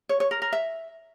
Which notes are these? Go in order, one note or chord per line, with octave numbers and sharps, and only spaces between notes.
C#5
C#5
A#4
A#4
E5